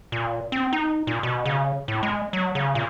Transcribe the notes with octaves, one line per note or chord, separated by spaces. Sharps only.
A#2
C4
D#4
A#2
B2
C#3
A2
G#3
F#3
C#3
A#2